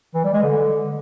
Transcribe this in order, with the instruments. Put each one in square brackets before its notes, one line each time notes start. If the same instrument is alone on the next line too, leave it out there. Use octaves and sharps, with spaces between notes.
[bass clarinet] E3
G3
G#3
D3